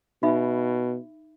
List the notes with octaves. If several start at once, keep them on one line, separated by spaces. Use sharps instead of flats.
B2 D#4 E5 B5